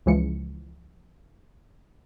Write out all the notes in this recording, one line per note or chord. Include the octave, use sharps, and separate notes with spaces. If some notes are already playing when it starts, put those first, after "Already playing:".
C#2 C#3 E3 F3 G#3 C#7